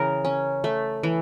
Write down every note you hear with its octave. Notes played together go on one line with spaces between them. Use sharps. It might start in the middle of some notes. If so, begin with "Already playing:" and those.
Already playing: C#3 E3 A#4
C#4
A3
E3